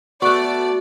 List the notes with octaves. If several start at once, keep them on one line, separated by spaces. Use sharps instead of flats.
A3 B3 F#4 D5 C#6 F#6